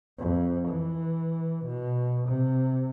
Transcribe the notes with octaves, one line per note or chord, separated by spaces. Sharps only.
F2
E3
B2
C3